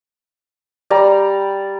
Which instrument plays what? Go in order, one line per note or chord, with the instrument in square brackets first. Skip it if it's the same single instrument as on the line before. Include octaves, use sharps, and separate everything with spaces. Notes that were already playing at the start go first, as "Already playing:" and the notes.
[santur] G3 D5 A#5